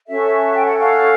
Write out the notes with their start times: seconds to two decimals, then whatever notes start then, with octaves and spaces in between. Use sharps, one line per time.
0.06 C#4 F#4 A4 E5
0.53 G5
0.65 F#5
0.77 F5